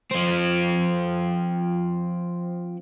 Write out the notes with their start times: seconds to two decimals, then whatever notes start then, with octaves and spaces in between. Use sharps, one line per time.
0.11 F3 C4